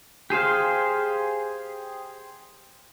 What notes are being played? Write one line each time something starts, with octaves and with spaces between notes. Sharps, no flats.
G4 G#4 C5 F5